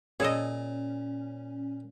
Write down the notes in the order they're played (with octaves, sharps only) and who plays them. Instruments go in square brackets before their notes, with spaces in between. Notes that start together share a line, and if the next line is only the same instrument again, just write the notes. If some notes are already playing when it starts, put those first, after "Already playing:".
[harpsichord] A#2 [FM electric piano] C#4 [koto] G#4 A4 D#5